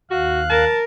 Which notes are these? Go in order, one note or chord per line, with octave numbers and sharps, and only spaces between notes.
D#2 F#4 F5 F#6
A#4 A5